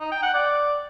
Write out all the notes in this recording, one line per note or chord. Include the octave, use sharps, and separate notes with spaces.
D#4
G5
F#5
D5